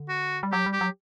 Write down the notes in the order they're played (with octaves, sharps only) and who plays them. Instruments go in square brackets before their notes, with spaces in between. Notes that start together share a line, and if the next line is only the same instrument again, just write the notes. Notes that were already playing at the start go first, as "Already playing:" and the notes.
Already playing: [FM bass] D3
[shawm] F#4
[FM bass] G3
[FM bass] F#3 [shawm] G4
[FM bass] G3
[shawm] G4
[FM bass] F#3